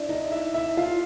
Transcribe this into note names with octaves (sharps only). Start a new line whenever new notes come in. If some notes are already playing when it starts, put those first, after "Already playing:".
Already playing: D4 E4 D5 E5
D#4 D#5
E4 E5
E4 E5
F4 F5